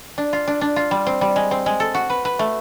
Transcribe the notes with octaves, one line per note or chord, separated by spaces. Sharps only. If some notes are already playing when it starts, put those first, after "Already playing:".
D4
F4
D4
D4
F4
G3
C4
G3
G#3
C4
G#3
A4
F#4
B4
B4
A3